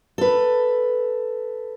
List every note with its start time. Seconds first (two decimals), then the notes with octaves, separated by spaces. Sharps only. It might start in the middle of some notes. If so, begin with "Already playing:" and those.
0.18 A4 B4